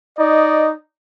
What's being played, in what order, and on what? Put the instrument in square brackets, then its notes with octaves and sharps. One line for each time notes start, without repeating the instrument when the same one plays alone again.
[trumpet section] D#4 D5 D#5